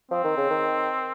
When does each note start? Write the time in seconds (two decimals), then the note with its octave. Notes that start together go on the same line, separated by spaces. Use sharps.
0.11 F3 C4
0.24 D#3
0.37 C#3
0.50 D#3